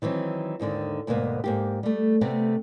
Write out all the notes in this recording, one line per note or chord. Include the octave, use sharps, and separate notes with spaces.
D#3 E3 F#3 C4
D#2 G#2 D3 D#3
D2 G#2 B2 A#3 B3
G#2 A#3 G4
G3 A3
C3 A3 B3 C4